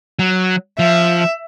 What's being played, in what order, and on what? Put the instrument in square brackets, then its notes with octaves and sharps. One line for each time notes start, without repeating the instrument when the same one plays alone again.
[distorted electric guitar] F#3
[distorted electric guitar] F3 [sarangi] E5